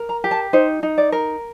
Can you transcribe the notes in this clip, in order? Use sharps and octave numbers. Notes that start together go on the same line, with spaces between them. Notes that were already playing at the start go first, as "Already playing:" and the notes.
Already playing: A#4
A#5
G4
A5
D#4 C5
D#4
D5
A#4